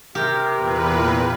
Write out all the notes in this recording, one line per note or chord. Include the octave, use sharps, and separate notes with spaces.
C3 G4 A#4
E2 A#2 B4